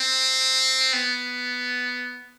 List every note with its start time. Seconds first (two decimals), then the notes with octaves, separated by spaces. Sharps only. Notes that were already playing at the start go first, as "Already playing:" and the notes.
Already playing: C4
0.93 B3